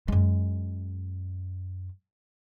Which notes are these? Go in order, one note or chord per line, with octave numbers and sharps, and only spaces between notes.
F#2 G#3